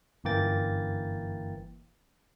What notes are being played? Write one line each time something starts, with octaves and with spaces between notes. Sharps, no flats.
G1 F#2 E3 A#3 G5 A6